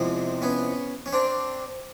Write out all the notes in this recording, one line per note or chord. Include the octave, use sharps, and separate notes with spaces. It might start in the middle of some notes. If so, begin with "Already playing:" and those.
Already playing: E2 C3 F3 G#3
B3 C#4
C#4
C4 D4